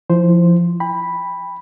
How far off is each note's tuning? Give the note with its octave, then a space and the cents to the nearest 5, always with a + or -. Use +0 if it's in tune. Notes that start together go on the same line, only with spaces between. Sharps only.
F3 -15 E4 +0 C5 +0
G5 +35 B5 +0